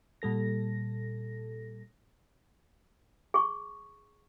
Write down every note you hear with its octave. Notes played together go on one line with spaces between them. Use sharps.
A#2 G3 A4 A#6
G#4 C#6